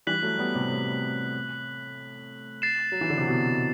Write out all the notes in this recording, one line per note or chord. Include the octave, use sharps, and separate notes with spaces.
E3 G3 F#6 B6 F#7
F#3 A3
G3 B3
A2 C3
A2
A6 C7 E7
F#3
E3
D3
C3
B2